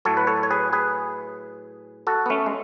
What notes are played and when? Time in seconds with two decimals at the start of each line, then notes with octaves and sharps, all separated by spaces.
0.05 A2 F#3 A4 C#5
0.17 B4
0.27 A4 C#5
0.43 C#5
0.51 G#4 B4
0.73 G#4 B4
2.07 F#4 A4
2.26 B3
2.30 A3 C#4
2.46 G#3